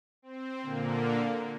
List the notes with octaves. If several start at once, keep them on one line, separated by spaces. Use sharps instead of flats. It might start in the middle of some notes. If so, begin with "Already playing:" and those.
C4
A#2 D3 A#3